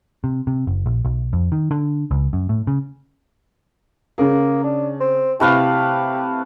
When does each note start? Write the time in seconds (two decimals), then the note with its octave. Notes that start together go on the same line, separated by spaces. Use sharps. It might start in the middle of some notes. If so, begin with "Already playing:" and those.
0.24 C3
0.47 C3
0.67 F#1
0.86 A#1
1.05 B1
1.33 F2
1.52 D#3
1.71 D3
2.11 C#2
2.33 F#2
2.49 A2
2.67 C#3
4.18 C#3 A#3 C#4 G#4
4.63 D4
5.00 C4
5.40 C3 A3 E4 G4 B4 F5